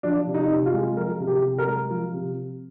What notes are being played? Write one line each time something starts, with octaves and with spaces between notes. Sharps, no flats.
F3 D4
C3
D#4
C3
F4
G#3
F3 A#4
C3
G4
C3
A#4
G#3
F3
C3